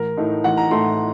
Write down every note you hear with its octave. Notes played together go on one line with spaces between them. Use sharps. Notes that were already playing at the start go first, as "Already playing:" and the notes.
Already playing: A1 A#4
A2 A3 D#4
A1 F#5
A#5
A2 A3 D#4 C6